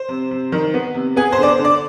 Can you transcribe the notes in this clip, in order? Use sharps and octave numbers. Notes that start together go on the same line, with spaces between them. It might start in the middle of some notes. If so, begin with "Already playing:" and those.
Already playing: C5
C3
C3
D#3
B3
C3
B3 G#4
C5
D3
D5
C5
D3
D5